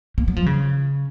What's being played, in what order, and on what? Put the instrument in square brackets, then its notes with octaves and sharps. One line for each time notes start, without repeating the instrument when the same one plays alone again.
[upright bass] A#3
F#3
F3
C#3